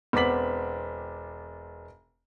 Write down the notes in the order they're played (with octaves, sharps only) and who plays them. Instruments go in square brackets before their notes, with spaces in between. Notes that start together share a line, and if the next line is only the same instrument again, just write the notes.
[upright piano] E1 B3 C4 D6 B6 F#7